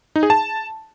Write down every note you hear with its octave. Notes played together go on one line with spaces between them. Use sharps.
D#4
G#4
A5